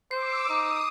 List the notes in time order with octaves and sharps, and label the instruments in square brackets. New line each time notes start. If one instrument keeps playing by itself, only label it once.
[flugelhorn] C5 [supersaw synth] D6 E6 [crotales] C7
[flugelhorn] D#4 [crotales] D6 [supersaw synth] D#6